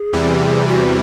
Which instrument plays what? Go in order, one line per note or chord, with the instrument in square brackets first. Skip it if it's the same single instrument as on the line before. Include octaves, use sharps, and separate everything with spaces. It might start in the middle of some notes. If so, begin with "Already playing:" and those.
Already playing: [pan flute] G#4
[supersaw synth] E2 C3 E3 G3
[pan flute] F#4